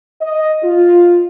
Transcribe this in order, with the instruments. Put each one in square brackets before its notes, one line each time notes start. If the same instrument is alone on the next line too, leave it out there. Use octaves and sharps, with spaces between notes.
[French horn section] D#5
F4